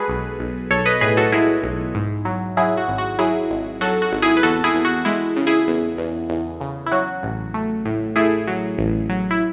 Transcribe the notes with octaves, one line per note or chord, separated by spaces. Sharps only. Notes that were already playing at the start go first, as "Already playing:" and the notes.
Already playing: G#3 F#4 G#4 A4 B4
B1
B1
B1 A4 C#5
B4 D#5
A2 G#4 B4
F#4 A4
G#3 E4 G#4
B1
G#2
F#3
F#3 E4 G#4
F#4
G#1
F#4
F#3 E4 G#4
G#1
F#3 F#4 A4
F#4
G#1
E4 G#4
B4
E2 F#4 A4
E4 G#4
E2
F#4
G#3 E4
C#3
E4 G#4
E2
E2
E2
C#3
E4
F#3 F#4
A1
A3
A2
A3 E4 G#4
F#3
A1
F#3
E4